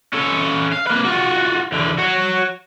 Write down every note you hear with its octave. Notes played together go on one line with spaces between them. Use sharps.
C#4 A4
F5
A#3 B4
F4 F#4
E2 D3
F#4 C#5